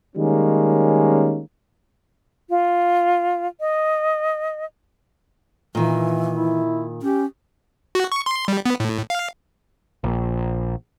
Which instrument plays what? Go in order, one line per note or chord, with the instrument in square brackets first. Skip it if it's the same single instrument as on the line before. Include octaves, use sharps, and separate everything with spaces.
[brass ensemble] D#3 G3 G#3 A#3 C#4
[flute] F4
D#5
[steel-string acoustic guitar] A#2 D#3 [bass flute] E3
[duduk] E4
[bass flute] C#4 [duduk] G4
[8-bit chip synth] F#4
C#6
C6
G3
B3
A2
F5
[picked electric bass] A#1